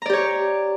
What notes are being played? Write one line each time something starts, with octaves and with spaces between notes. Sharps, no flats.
G4 C#5 D5 A#5